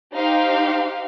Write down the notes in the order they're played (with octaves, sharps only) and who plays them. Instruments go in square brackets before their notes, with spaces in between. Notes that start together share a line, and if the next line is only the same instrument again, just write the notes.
[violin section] D#4 G4 C5 F5